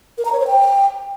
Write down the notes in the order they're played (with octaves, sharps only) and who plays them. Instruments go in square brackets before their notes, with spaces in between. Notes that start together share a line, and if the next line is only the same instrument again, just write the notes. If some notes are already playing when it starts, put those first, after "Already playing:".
[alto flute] A#4
A#5
C#5
C5
G5